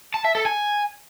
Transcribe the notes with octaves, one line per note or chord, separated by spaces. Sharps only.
A5
E5
A4
G#5